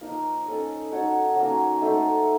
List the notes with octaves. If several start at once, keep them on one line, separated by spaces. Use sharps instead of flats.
F3 A#3 D#4 A#4
C#4 A4 D#5
D#4 F#4 A4 C#5
F#3 A#3 C#4
A3 D#4 A4 C5